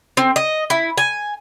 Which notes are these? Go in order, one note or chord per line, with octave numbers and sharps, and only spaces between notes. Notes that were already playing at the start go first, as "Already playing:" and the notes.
C4
D#5
E4
G#5